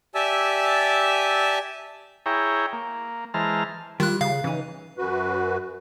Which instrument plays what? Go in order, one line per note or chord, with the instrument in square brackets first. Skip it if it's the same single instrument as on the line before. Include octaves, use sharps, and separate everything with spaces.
[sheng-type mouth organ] G4 D5 E5 G#5 A5 E6
[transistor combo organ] E4 G#4 C#5 G5 A#5
A#3
E3 G#3 C5 A5 A#5 F6
[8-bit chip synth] D#3 F#6 [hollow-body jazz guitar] G3 [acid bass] F4
[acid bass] C#3 [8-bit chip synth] F5
[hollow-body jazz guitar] C#3 D#4 [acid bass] E3
[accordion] F#2 F#4 B4